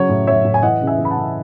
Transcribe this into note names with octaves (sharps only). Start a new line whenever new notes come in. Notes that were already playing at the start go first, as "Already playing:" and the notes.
Already playing: C#3 F#3 C#5
A2
F#3 C#5 E5
A2
G#5
E3 D#5 F#5
C#3
E5 G#5
E3
B5
F#5 A5
C#3